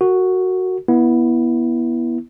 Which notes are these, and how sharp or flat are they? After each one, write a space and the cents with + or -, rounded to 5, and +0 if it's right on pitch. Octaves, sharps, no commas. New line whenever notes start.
F#4 +0 A#4 -30
B3 -20 E4 +0